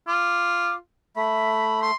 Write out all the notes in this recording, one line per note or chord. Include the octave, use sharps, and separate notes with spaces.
F4 D6
A3 E5 B5
C6